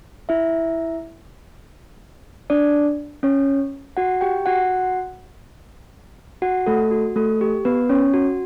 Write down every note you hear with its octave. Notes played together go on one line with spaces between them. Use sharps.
E4 E5
D4 D5
C#4 C#5
F#4 F#5
G4 G5
F#4 F#5
F#4 F#5
A3 A4
F#4
A3 A4
G4
B3 B4
C#4 C#5
F#4